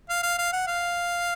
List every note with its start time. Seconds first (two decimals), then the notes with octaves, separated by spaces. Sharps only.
0.09 F5
0.23 F5
0.38 F5
0.53 F#5
0.67 F5